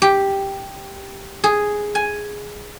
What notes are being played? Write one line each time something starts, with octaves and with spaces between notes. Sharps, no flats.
G4
G#4
G#5